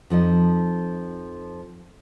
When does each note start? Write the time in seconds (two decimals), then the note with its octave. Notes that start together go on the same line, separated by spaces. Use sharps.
0.10 F2 F3 D#4 D#5